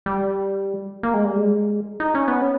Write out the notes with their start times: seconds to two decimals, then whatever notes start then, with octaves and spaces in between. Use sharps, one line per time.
0.06 G3
1.03 A#3
1.14 G#3
1.25 G3
1.36 G#3
2.00 D#4
2.15 C#4
2.28 B3
2.42 C#4